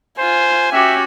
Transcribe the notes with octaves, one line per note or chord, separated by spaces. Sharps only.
F4 C5 G#5
C#4 F#4 G4 E5